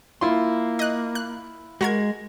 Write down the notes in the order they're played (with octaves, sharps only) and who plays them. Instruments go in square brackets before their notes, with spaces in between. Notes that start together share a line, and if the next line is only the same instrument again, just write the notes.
[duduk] A#3 [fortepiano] E4 F4 C6
[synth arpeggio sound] D#5 F#6
F#6
[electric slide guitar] G#3 [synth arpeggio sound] F#4 A#4 G#6